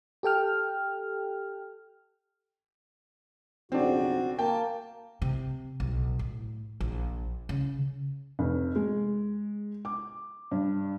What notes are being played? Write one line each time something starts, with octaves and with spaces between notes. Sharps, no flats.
G4 A4 G5 F6
B1 F2 C#3 C4 D4 F#4
A#3 G5 A5
C3
B1
A2
A#1
C#3
F1
G#3
D6
G2